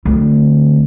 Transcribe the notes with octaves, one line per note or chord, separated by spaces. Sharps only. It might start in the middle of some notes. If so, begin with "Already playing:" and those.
D2 C4